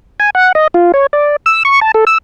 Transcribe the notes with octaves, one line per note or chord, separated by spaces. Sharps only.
G#5
F#5
D#5
F4
C#5
D5
E6
C#6
A5
A4
E6